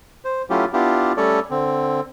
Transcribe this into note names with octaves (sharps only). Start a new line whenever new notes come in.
C5
F#3 A3 C#4 E4 F4 G4
B3 D4 E4 F4 G4
G3 A3 C#4 A4 C#5 D5
D3 C4